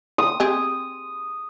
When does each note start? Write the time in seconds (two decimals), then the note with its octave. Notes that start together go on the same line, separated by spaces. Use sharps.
0.18 D#6
0.40 C4 G4 G#4